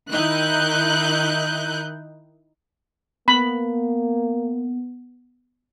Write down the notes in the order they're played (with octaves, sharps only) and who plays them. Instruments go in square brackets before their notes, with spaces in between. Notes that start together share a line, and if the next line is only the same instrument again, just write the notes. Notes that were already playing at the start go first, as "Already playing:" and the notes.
[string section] D#3 D#4 E4 F#6 G6
[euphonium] A#3 [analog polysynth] B3 [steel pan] B5